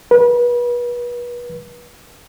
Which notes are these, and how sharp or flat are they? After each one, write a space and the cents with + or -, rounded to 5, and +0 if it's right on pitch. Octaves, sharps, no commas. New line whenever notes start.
B4 -35